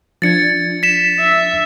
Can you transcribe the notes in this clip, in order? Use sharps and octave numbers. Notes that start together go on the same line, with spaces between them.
F3 D4 G#6 A6 C#7
B6 E7
E5